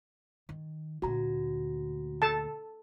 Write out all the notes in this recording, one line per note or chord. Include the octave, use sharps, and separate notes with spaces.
D#3
D2 A#2 F#4 A#5
A4 A5